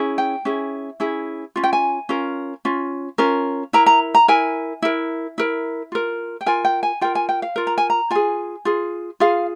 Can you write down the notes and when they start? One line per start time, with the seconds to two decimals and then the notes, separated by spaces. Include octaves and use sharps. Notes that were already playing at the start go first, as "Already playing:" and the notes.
Already playing: C#4 E4 G#4
0.18 G5
0.45 C#4 E4 G#4
1.00 C#4 E4 G#4
1.56 C#4 F4
1.64 G5
1.73 G#5
2.09 C#4 F4 A#4
2.65 C#4 F4
3.18 C#4 F4 A#4
3.73 E4 A#4 A#5
3.86 A#5
4.15 A#5
4.28 E4 A#4 G#5
4.82 E4 A#4
5.38 E4 A#4
5.92 F4 A#4
6.41 G5
6.46 F4 A#4 G#5
6.65 G5
6.83 G#5
7.01 F4 A#4 G5
7.15 G#5
7.29 G5
7.42 F5
7.56 F4 A#4
7.67 A#5
7.78 G#5
7.90 A#5
8.10 F4 G#4 G#5
8.65 F4 G#4
9.20 F4 G#4 F5